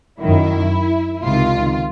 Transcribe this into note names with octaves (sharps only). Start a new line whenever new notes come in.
F#2 D#3 E4
C#2 C3 D#3 F4